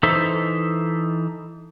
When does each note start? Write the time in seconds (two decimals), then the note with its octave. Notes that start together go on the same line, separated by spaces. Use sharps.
0.03 E3 D#4 A4 C5 E5